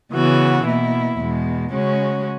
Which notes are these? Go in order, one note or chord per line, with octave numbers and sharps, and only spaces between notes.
C#3 E3 B3 F#4
B2 A#3 E4
E2 B2 G#3
C#3 G#3 C#4 F#4